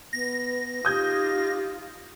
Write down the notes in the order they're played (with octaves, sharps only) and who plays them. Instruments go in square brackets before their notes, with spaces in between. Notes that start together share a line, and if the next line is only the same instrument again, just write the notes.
[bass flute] B3 [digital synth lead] A#6
[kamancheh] D#4 F4 [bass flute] G4 [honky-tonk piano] D#6 G6 G#6